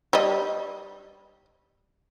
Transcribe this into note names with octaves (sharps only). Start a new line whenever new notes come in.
G3 D#5